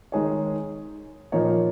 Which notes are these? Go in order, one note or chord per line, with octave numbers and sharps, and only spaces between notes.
D#3 G#3 D#4 G#4 C#5
A#2 F3 A#3 D#4 C#5